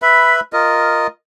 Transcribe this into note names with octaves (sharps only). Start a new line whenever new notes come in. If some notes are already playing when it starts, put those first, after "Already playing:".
B4 E5 B5
F4 A#4 D#5